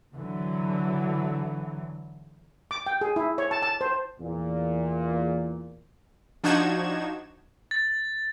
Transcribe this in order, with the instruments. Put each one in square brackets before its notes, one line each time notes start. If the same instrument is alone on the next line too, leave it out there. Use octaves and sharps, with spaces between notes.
[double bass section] D3 E3 F#3
[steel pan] D6
G5
G#4
E4
C#5
A5
A5
C5
[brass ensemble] E2 A#2
[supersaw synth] F3 D4 D#4 F#4 G#6 E7
[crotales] A6